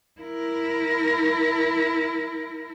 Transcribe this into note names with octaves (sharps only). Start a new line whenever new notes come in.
E4 A#4